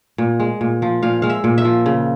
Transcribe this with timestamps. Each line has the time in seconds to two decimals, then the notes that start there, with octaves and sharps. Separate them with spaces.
0.18 A#2
0.40 G#3
0.61 A#2
0.82 F3
1.03 A#2 F5
1.22 G#3 F5
1.30 E5
1.44 A#2
1.58 E5
1.65 F3
1.86 C#3